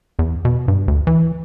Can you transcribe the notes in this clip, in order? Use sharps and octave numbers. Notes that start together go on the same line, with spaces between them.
E2
B2
G2
D2
E3